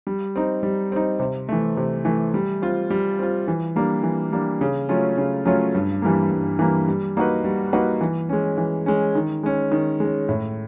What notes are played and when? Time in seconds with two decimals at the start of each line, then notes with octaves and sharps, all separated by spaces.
0.07 G3
0.36 C4 D#4
0.63 G3
0.92 C4 D#4
1.20 C3
1.49 E3 A3
1.77 C3
2.05 E3 A3
2.34 G3
2.62 C4 F4
2.90 G3
3.19 C4 F4
3.48 E3
3.76 G3 A#3 D4
4.03 E3
4.32 G3 A#3 D4
4.61 C#3
4.89 F#3 A3 C#4 F4
5.18 C#3
5.45 F#3 A3 C#4 F4
5.75 G2
6.02 E3 G3 A#3
6.30 G2
6.59 E3 G3 A#3
6.88 G3
7.17 A#3 D#4 F#4 B4
7.44 G3
7.73 A#3 D#4 F#4 B4
8.01 E3
8.29 G#3 C#4
8.57 E3
8.86 G#3 C#4
9.15 D#3
9.43 G#3 C#4
9.72 D#3
10.00 G#3 C#4
10.29 A2